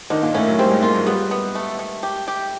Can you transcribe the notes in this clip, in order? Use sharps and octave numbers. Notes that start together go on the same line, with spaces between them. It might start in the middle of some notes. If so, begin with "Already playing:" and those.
D3 D#3 D#4
A#2 A#3
A2 A3 C#4
F#3
G3 C4
G#2 G#3
A#2 A#3 F4
F#3
G3 B3
B3
A3
A3
G4
G4